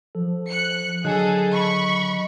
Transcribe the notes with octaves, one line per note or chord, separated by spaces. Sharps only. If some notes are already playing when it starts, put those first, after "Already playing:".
F3 A4
F#6 C#7
D3 F#3 G#4 A4 D#5 F#6
B5 C#6